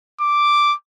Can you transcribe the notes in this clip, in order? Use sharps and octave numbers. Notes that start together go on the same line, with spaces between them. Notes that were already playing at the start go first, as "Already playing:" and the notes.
D6